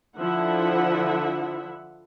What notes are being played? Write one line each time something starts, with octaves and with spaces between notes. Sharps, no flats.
D3 F3 E4 E5 F#5